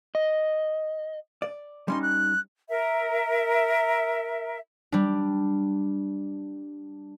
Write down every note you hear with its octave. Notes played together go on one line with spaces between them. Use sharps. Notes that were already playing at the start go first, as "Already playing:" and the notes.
D#5
D5
G3 C#4 D#4 C6
F#6
A#4 E5
G3 D4